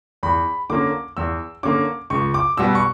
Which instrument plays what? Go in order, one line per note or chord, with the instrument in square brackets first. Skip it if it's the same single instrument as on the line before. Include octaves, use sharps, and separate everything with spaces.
[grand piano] E2 B5
D3 A#3 C#4 D6
E2 E6
D3 A#3 C#4 D6
C#2 C#6
D6
B2 G3 B3 E6
C#6